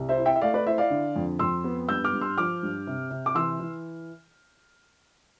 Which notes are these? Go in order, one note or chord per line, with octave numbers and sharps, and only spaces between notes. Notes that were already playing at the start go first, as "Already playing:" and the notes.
Already playing: C2
C5 E5
E4
E5 G5
E5
A3 D5 F5
B4 D5
E4 C5 E5
D5 F5
D3
F2
F2 C6 E6
B3
G2 E6 G6
D6 F6
G2
C6 E6
F3 D6 F6
G2
C3
C3
D6
E3 C6 E6
E3